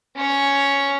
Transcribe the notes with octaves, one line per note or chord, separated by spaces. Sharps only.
C#4 C#5